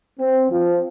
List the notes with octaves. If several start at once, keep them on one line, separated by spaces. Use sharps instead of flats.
C4
F3